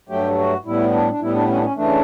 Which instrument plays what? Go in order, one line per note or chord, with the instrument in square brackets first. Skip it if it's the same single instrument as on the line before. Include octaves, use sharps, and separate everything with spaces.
[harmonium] G2 F#3 A3 G4
F#4
A2 G3 B3 E4
D4
D4
A2 G3 B3 E4
D4
C#4
D4
C#4
C#3 E3 A3 D4